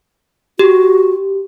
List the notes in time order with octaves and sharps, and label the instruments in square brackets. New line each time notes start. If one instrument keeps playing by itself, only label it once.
[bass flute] F#4 [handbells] G4